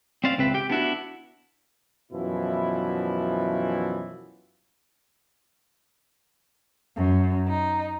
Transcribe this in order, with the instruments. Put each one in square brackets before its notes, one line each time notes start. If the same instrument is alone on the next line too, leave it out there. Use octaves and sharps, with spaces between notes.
[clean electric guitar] C4 C#4 C5 D5 F5
C#2 C4 B4 E5
G4 G5
B3 D4 E4 F#4
[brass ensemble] F#2 B2 E3 F3 E4
[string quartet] F#2
D#4